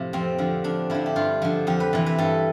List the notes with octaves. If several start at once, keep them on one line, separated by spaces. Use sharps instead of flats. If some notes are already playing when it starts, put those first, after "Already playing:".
Already playing: A2 C3 F3
F2 C4
D3 F3
F2 D4
D3 F3 E4
G4
G2 F4
D3 F3
F2 G4
B4
C3 E3
B4
G2 A4